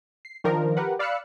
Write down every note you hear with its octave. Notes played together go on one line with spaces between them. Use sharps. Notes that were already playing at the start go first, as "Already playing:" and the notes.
C7
D#3 F3 D4 A#4
G4 A#4 B4 F#5
D5 F5 B5 E6 F#6 C#7